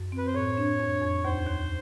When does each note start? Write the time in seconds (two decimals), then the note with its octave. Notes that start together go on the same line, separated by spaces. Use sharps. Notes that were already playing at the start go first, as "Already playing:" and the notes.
Already playing: F#2
0.12 C4
0.18 B4
0.27 C5
0.34 A2 C#5
0.58 D4
0.80 F2
1.02 F2
1.25 D#2 C5
1.47 D#2